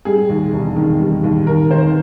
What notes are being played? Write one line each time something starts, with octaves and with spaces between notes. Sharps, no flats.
G3 G#4
D#2
E1
D#3
G3
D#2
D#2 A#4
D#3 C5